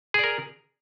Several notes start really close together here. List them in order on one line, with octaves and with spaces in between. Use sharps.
G#4 D5 A#4